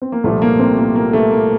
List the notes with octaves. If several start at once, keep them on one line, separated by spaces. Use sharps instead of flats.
C4
A#3
C2 A#2 F3 A3
A#3
C3 C4
A#3
A#3
A3
A#3